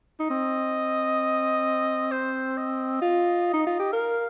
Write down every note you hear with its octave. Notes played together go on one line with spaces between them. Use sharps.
D#4
C4 D#5
C5
D#5
F4
D#4
F4
G4
A#4 F5